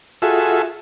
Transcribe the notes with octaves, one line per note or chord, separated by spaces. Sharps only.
F4 F#4 G#4 A4 E5